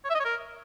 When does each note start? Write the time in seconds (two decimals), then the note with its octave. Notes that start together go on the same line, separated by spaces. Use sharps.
0.04 C#5
0.09 E5
0.15 D#5
0.20 C#5
0.25 A#4